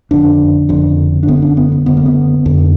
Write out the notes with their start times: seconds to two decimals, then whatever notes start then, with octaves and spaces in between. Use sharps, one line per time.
0.11 F#1 F2 D3 D4
0.69 F#1 F2 D3
1.23 D4
1.28 F#1 F#2 D3 B3
1.42 D4
1.57 B3
1.72 B3
1.86 F#1 F#2 D3 B3
1.97 A#3
2.06 B3
2.45 F#1 F2 D3